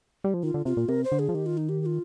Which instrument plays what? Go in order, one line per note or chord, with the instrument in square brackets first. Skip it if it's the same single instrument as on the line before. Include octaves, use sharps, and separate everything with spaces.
[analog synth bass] G3
F3
[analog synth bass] D#3 [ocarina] F4
[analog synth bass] D3
[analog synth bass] C3 [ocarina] F4
[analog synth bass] A#2
[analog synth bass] C3 [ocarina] A#4
[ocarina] C5
[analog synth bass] D3
[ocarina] G#4
[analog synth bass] F3
[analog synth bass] D#3 [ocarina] G4
[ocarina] F4
D#4
G4
G4
F4